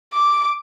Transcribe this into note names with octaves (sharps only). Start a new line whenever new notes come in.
D6